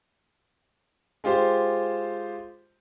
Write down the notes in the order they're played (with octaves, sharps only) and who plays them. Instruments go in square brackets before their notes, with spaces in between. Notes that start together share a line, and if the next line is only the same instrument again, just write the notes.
[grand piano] G#3 F4 G4 C5